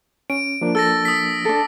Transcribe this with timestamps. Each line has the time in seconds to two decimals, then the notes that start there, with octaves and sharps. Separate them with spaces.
0.30 C#4 D7
0.61 F3 A#3 D4
0.75 A4 E6 A6 A#6
1.05 D#6 B6
1.45 D4 A4